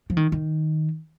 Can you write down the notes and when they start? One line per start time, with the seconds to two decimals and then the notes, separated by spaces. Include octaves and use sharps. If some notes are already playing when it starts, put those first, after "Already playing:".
0.10 F3
0.17 D#3
0.32 D#3